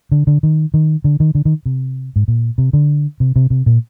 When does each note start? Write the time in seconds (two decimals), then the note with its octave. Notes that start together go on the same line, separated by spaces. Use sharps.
0.11 D3
0.27 D3
0.43 D#3
0.74 D#3
1.04 D3
1.20 D#3
1.35 D3
1.45 D#3
1.66 C3
2.16 G#2
2.28 A#2
2.58 C3
2.73 D3
3.20 C3
3.36 C3
3.50 C3
3.66 A#2